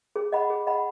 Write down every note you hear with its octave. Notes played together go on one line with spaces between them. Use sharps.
G#4
D#5 F#5 B5
G#4
D#5 F#5 B5